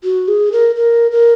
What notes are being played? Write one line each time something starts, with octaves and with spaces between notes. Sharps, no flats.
F#4
G#4
A#4
A#4
A#4